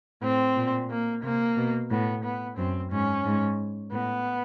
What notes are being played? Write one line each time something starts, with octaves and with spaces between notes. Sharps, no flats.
A2 C4
A#2
A#3
C3 A#3
B2
A2 B3
B3
F#2 C4
G#2 C#4
G#2
A2 B3